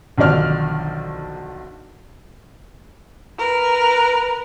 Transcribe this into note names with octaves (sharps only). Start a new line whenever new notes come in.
B1 D3 D#3 F3 D5 F6
A#4 B4